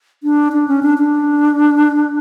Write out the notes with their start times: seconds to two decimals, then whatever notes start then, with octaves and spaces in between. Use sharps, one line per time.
0.23 D4
0.52 D4
0.68 C#4
0.83 D4
0.98 D4